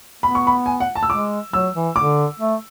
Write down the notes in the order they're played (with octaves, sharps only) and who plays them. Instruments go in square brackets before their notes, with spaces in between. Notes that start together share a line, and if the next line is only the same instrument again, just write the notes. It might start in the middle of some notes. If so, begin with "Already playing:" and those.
[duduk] B3 [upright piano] B5
[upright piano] C#6
B5
G#5
F#5
A5
E6
[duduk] G#3 [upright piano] D6
[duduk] F#3 [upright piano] E6
[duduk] E3
[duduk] D3 [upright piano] D6
[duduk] A3